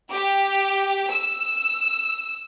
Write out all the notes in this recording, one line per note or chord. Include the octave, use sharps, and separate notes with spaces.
G4
E6